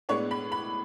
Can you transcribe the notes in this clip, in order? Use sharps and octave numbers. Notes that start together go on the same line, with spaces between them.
A2 G#3 B3 D4 C#5
B5
B5